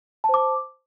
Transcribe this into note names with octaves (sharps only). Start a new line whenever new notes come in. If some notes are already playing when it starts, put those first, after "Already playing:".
C5 A5 D6